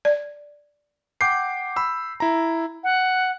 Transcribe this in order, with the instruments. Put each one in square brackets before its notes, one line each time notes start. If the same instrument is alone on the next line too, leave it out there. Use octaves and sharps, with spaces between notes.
[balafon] D5
[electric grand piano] F#5 G5 D6 G6 C7
B5 E6
E4 A#5
[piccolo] F#5